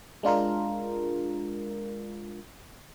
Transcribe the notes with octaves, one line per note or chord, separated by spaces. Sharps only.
G#3 D4 F4 A#4